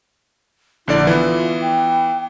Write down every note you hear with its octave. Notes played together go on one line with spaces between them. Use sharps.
A#1 D3 E4 D5
E3 B3 F4
G5